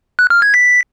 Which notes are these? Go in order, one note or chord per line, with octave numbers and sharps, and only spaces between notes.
F#6
F6
G#6
B6